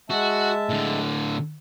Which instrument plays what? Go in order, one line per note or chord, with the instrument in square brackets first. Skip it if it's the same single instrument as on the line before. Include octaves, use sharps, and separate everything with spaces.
[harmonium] G#3 E5 A5 [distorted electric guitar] F#4
[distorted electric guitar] A2 D3